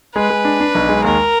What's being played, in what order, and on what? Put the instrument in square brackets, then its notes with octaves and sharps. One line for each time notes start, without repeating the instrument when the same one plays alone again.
[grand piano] G#3 [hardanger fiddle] B4
[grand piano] G#3
D4
D4
B1
G#3
[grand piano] D#2 [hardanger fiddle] A#4